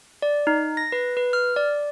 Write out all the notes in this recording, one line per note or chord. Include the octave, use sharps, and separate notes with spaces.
D5
D#4
A#6
B4
B4
F6
D5